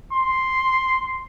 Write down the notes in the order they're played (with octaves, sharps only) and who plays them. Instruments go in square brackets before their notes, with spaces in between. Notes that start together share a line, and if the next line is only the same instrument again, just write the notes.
[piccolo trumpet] C6